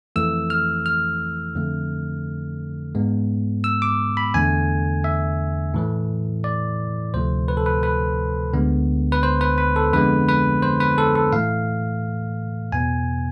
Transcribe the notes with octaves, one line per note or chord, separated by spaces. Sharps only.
F2 E3 A3 E6
F6
F6
F2 D3 A3
G#2 G#3 B3
E6
D6
B5
E2 D3 A3 G#5
E5
A2 E3 A3
D5
D2 C3 F3 A3 C5
B4
A4
B4
B4
D2 D3 G#3 B3
B4
C5
B4
B4
A4
F2 D3 G#3 B3 B4
B4
C5
B4
A4
A4
A2 E3 A3 F5
E2 B2 B3 G#5